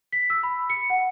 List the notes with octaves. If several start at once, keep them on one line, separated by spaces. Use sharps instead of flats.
B6
E6
B5
C#7
F#5